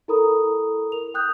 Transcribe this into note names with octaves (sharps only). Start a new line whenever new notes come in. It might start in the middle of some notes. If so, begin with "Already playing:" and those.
E4 A4 A#4 A#5 B5 D#6
A#4 F7
G5 D#6 F#6 G6